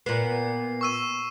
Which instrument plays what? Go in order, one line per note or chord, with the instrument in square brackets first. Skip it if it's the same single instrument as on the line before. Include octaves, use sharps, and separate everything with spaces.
[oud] A#2 B3 [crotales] C7
[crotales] C#6 E6 D#7